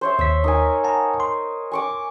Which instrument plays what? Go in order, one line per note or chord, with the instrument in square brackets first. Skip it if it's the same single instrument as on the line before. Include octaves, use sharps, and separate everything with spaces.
[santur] C5 C#5 E5
[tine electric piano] D#2 B6 [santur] E5
[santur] D#4 A#4 G#5
[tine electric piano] F#5 A5 A#5
C6
[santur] G#5 C#6 D6